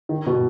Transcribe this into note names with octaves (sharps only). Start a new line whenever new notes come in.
D#3
B2